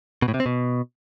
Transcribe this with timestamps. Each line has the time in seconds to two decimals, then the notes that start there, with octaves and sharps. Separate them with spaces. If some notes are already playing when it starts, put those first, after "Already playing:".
0.22 B2
0.28 A2
0.34 C3
0.40 C4
0.46 B2